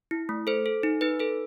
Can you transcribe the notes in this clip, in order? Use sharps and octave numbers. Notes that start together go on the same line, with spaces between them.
E4
A3
A4 C5
A4
D#4
D#4 B4
A4 B4